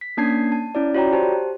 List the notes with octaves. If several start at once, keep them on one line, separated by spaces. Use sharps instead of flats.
B6
A#3 C#4 D4 A5 G#6 C7
A5
C#4 E4 D5
F4 F#4 C#5 D5 G5 A#5
G4 C5 A5